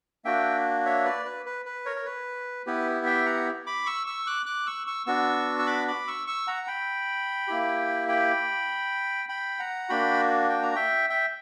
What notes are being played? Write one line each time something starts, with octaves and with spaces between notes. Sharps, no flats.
A#3 D4 F#4 E5 G5
C#5 E5
B4 D5
B4
B4
B4
A#4 C#5
A#4
B4
B3 E4 G4 B4
E5 G5
F#5 A#5
B5 D6
C#6 E6
C#6 E6
D6 F#6
D6 F#6
C#6 E6
C#6 E6
B3 D4 F#4 C#6 E6
E6
B5 D6
B5 D6
C#6 E6
C#6 E6
F#5 A#5
G5 B5
A#3 E4 G4
G5 B5
G5 B5
F#5 A#5
A#3 D4 F#4 G5 B5
G5
A#5
E5 G5
E5 G5